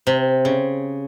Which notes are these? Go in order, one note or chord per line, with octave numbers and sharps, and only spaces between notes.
C3
C#3